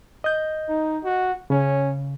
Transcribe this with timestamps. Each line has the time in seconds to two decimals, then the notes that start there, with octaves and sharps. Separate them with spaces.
0.24 D#5 G6
0.69 D#4
1.04 F#4
1.50 C#3 C#4